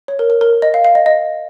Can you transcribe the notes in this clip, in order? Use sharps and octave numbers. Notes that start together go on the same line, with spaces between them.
C#5
A#4
A#4
A#4
D#5
F5
F5
D#5
D#5